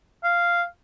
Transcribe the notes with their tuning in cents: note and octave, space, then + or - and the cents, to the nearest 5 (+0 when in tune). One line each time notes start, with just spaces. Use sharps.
F5 -5